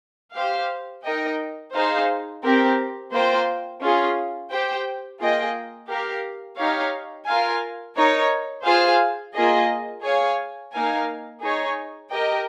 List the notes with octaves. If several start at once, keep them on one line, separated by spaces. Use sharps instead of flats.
G4 C5 F5
D#4 A#4 D#5 G5
D#4 G#4 C5 F5
C4 G4 A#4
A#3 F4 C5 G5
C#4 F4 G#4
G4 C5 G5
A#3 F4 G#4 D#5 G5
G4 A#4 F5
D#4 G4 C#5 F5
F4 A#4 F5 G#5
D#4 A#4 C#5
F4 G#4 C5 F5
A#3 F4 G#4 D#5
G#4 C#5 F5 G#5
A#3 D#4 A#4 F5 G#5
D#4 G#4 C#5 G#5
G4 A#4 D#5 G5